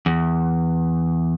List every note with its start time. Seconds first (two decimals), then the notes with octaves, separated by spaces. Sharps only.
0.06 E2